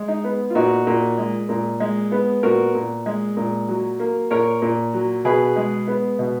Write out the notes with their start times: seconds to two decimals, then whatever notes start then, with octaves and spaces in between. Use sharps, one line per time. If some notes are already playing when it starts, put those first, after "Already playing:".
Already playing: G#3
0.08 D#4
0.24 B3
0.50 F4
0.55 A#2 D#4 F#4
0.87 A#2
1.18 G#3
1.49 A#2
1.80 G#3
2.12 B3
2.43 A#2 F#4 A#4
2.74 A#2
3.06 G#3
3.37 A#2
3.68 F#3
3.99 A#3
4.31 A#2 A#4 C#5
4.62 A#2
4.94 F#3
5.25 B2 G#4 B4
5.56 G#3
5.87 B3
6.19 B2